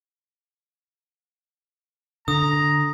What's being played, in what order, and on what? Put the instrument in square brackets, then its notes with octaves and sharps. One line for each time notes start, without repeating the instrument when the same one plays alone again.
[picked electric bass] D3 [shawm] A#5 [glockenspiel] D#6